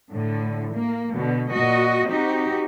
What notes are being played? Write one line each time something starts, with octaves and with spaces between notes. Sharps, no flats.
A2 D3
A#3
B2 D3
A#2 F#4 D#5
C4 D#4 F#4 G4